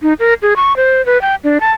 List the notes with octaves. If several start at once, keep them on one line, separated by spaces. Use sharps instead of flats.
D#4
A#4
G#4
C#6
C5
B4
G5
D4
A5